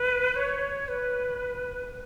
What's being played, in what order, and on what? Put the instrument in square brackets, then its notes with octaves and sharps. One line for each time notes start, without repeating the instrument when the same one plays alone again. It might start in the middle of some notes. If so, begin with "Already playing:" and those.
Already playing: [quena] B4
C#5
B4